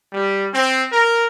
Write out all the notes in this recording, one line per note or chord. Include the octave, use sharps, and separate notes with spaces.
G3
C4
A#4